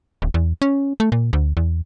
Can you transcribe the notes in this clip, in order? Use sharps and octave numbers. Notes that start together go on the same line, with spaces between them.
D1
E2
C#4
A3
A#2
D2
E2